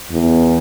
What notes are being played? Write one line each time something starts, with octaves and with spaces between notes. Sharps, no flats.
E2